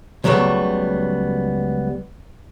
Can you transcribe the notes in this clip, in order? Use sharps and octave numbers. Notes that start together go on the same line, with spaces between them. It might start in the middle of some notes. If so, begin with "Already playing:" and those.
C#2 F#3 G3 A3 B3